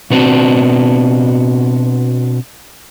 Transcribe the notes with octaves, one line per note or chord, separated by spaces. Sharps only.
B2 B3 C4 D4 F#4